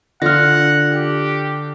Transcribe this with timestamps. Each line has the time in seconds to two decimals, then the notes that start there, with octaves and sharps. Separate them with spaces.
0.22 D3 D4 F4 F#5 F6 A#6
0.92 G4